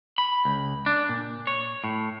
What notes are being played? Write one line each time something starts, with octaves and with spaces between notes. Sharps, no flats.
B5
C#2
D4
A#2
C#5
A2